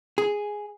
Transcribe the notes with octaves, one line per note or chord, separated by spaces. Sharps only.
G#4